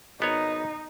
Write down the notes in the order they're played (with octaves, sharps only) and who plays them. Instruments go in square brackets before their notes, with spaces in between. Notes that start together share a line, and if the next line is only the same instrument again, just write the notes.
[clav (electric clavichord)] G#1 B3 C#5 [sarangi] D#4